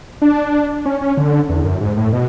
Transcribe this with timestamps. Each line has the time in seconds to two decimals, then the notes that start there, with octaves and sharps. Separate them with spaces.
0.22 D4
0.85 C#4
1.01 C#4
1.17 D3
1.49 E2
1.65 F#2
1.81 G#2
1.97 A2
2.13 B2